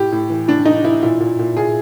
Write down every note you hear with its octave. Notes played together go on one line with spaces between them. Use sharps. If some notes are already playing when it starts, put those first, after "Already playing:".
Already playing: A2 G4
A2
E3
A2 D4
A2 D#4
E3 E4
A#2 E4
A#2
A#2
A#2 G#4